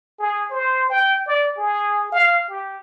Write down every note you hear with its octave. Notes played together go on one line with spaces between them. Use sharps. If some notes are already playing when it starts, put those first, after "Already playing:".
G#4
C5
G5
D5
G#4
F5
G4